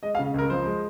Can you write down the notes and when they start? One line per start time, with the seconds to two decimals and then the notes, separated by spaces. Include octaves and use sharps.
0.03 G#3 D#5
0.15 F5
0.19 C#3
0.34 C#2 A#4
0.50 F3 C5
0.66 G#3